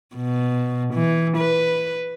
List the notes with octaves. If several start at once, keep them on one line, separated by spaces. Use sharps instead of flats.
B2
E3
B4